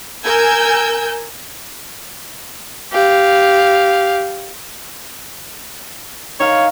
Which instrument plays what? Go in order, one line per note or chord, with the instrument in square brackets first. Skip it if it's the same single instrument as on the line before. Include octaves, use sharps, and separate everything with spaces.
[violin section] A#4 G#5 E6 G6
[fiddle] G4 F5
[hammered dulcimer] D#3 F5 [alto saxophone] C#5